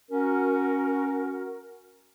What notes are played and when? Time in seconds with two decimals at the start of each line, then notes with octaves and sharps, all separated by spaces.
0.11 C#4 F#4 A#4